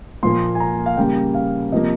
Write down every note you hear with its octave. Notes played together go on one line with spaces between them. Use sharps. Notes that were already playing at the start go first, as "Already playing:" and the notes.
A#2 F3 A#3 C6
G#5
A#5
F5
C#3 G3 A#3 G5
F5
C3 F3 A#3 D#5